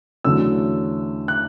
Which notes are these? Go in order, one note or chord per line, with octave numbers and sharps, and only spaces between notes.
E2 D3 F#3 A3 C#4 E6
F#6